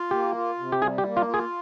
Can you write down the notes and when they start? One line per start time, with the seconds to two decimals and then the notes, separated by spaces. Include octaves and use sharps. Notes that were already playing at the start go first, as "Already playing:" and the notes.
Already playing: F4
0.11 A#3 G4
0.35 F4
0.59 C3
0.72 G4
0.81 G3 G#4
0.98 G4
1.05 A#3
1.17 F4
1.28 F4
1.34 G#4